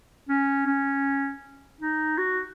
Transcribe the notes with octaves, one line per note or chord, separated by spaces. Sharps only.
C#4
C#4
D#4
F#4